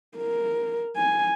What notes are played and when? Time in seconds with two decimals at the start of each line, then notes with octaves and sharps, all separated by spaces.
0.18 A#4
0.96 G#5